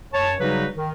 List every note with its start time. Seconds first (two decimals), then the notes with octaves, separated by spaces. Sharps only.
0.13 F#2 C#5 A5
0.40 C#3 F#3 G3 D#4 F#4 B4
0.76 D#3